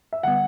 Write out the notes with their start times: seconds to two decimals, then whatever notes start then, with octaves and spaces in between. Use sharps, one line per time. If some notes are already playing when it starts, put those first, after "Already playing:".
0.13 E5
0.23 D3 G3 B3 F#5